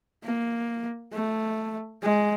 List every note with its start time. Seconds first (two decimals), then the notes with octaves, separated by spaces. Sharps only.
0.24 A#3
1.14 A3
2.02 G#3